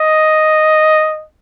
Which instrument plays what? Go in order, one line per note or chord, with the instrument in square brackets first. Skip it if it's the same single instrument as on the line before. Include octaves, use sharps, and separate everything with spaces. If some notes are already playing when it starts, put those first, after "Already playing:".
Already playing: [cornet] D#5